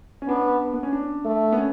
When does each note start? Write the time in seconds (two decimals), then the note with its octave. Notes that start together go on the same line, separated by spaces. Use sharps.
0.22 C#4
0.28 B3 D4
0.73 B3
0.83 C#4
0.93 D4
1.25 A3
1.52 B3
1.58 C#4